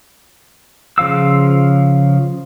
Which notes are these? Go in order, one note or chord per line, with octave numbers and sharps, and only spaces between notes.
C#3 F3 F5 E6